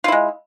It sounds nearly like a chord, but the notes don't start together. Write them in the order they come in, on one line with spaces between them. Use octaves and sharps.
F4 E4 G#3